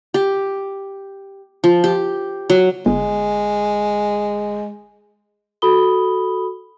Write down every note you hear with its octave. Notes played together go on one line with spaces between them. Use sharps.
G4
F3
G4
F#3
G1 G#3
F#4 A4 B5 D#6 G7